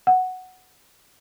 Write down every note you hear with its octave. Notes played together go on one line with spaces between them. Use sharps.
F#5